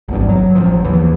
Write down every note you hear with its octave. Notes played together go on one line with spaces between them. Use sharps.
G#1 E2 G2
F#3
A1 F3
D#2 E3